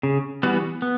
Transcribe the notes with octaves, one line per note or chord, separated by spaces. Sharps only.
C#3
E3 G3 B3 F#4
B3